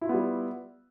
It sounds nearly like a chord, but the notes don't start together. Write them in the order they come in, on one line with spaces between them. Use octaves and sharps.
E4 F4 B3 G3